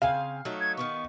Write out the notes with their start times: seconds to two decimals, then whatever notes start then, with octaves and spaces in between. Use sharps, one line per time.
0.02 C#3 C4 F5 G#5
0.45 F#3 A3 D#4
0.61 G#6
0.77 D#3 F3 B3 C#6